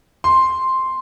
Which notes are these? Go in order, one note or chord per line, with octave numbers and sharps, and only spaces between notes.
C6